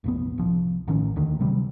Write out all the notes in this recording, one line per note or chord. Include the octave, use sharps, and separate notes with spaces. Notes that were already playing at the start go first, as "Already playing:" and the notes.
F1 A#1 B3
C2 F3
A1 D#3 C#4
D2 D3 D#3
C3 F#3 G3